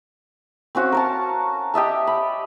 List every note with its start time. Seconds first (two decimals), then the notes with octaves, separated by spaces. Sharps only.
0.75 C4 C#4 F#4 F5
0.92 A#4 C#5 A5
1.74 G4 D#5 E5 A5
2.07 B5